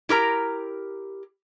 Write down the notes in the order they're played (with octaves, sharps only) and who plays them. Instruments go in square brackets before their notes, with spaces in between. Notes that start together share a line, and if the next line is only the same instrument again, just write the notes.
[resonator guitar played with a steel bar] E4 G4 A#4 A#5